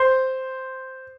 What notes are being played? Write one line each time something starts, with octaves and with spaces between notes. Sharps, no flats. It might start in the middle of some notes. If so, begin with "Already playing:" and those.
Already playing: C5 C6